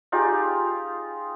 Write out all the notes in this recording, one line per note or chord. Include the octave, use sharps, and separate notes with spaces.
D#4 F4 G4 G#4